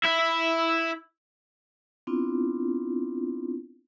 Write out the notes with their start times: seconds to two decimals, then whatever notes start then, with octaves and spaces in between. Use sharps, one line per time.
0.04 E4 E5
2.07 B3 C4 D4 E4 F4